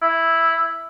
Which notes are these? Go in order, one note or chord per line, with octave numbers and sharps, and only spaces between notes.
E4